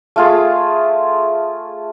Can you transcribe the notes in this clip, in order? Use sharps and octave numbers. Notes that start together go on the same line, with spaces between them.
A3 F4 G#4